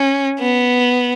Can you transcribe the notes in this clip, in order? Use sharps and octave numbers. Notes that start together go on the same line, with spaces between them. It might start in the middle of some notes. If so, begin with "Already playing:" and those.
Already playing: C#4
B3